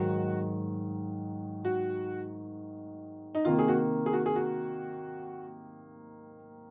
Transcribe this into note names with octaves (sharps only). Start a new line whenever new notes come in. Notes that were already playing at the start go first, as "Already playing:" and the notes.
Already playing: G#2 D#3 F#3 F#4
F#4
D#4
C3 D#3 A#3 F4
G#4
F#4
G#4
F#4
G#4
F#4